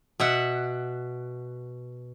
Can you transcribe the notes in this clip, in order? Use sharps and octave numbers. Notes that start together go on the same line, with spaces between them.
B2 E5 F#5